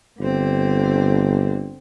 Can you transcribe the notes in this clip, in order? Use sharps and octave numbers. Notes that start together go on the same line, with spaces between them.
G1 D3 C4